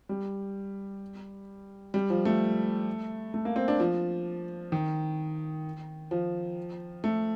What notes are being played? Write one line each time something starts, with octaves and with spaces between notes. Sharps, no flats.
G3
G3
F3
A3
A3
A#3
C4
D4
F3
D#3
F3
A3